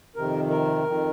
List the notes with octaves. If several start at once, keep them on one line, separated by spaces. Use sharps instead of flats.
F2 C3 D#3 A#4
A#4
F2 D#3